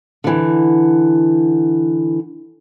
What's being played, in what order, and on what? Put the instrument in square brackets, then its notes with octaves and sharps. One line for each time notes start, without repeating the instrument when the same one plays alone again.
[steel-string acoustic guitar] D3 E3